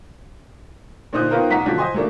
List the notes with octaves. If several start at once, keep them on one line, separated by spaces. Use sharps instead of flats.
A#2 D3 D#4 C5 D#6 F#6
D#3 B3 F4 A#4 C5
B1 F#5 A#5 B6
B2 D3 F3 F#3
C5 D#5 G#5 C6
F#3 A3 A#3 D4